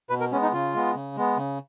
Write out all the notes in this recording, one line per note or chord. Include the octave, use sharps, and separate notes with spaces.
B2 B4
A#4
G#3 B3 C#4
D#4
C#3 F4
G#3 B3
C#3
G#3 B3
C#3